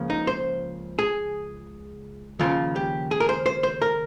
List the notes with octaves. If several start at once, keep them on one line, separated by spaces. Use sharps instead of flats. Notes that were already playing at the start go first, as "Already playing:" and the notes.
Already playing: C#2 C#3 F3 A#3
D#4
C5
G#4
D#2 C#3 F3 F4
G4
G#4
A#4
C5
C5
C5
A#4